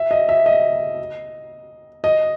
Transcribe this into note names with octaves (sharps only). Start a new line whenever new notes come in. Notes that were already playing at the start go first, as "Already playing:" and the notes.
Already playing: E5
D#5
E5
D#5
D#5